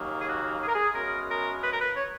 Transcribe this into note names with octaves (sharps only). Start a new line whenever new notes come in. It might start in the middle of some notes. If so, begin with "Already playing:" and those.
Already playing: D#2 C#3 F#3 A#3
G#4
F#4
G#4
A#4
G#4
F#2 C#3 G#3 B3 A#4
A#4
B4
A#4
B4
C#5